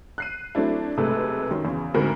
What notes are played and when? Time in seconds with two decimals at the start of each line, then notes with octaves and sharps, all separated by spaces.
0.18 F#6 C7 D#7
0.55 F#3 A3 C4 D4 E4
0.97 B1 C3 G#3 A3 B4
1.51 F#2 D#3 F#3
1.65 E2 C#3
1.94 D2 G#2 C4 F#4 A#4 B5